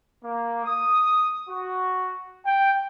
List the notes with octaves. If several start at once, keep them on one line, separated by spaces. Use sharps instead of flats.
A#3
D#6
F#4
G5